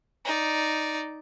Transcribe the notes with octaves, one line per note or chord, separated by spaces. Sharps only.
D#4 D5